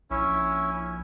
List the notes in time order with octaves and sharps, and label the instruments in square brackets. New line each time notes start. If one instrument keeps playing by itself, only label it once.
[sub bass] A#1 [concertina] C#4 E4